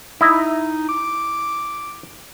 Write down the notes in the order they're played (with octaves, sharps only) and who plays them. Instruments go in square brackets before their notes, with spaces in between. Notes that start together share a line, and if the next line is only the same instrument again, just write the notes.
[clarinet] D#4 [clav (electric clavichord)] E4 D#5
[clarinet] D6